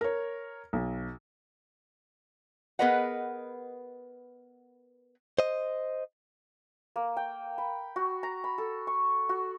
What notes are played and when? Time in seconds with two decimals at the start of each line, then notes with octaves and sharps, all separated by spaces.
0.01 A#4 C#5
0.73 B1
2.79 B3 G#4 A#4 B4 D#5 F#5
5.39 C5 D#5
6.96 A#3
7.17 G5
7.58 B5
7.96 F#4
8.23 A#5
8.44 B5
8.58 A4
8.87 C#6
9.29 F#4